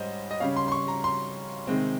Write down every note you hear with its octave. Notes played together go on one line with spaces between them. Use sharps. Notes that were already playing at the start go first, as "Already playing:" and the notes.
Already playing: G#2 G3 C#4 C5 D#5
D#5
C#3 G3 C#4 F5
C6
C6
C#6
A#5
C6
C3 D#3 G#3 C4